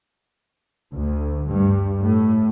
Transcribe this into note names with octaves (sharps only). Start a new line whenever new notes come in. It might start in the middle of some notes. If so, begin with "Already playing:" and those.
D2
G2
A2